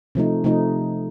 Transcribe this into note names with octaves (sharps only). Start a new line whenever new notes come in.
C3 F3 A3 D#4
C3 F3 A3 D#4